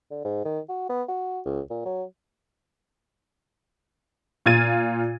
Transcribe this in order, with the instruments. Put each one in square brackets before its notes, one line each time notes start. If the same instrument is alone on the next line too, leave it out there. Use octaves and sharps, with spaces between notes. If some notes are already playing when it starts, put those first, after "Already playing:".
[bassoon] D3
G#2
D#3
F#4
B3
F#4
C#2
A#2
F#3
[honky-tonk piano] A#2 F4 G#6 A6 D#7